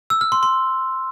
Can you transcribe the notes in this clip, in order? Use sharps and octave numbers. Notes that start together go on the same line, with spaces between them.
E6
F6
C6
C6